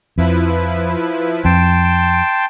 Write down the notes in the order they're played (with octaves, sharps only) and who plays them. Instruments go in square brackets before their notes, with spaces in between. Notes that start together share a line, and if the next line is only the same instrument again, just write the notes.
[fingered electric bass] F2 [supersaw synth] F3 E4 B4
[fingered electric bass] F2 [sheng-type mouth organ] G5 A5 C6 [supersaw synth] D7 E7